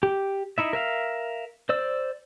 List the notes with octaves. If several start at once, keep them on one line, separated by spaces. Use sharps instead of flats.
G4
D#4 E4 E5
A#4 E5 F5
C5 D5 E6